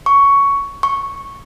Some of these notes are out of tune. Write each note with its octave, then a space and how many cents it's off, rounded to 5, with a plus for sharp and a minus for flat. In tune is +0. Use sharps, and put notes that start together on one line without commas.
C#6 +10
C#6 -5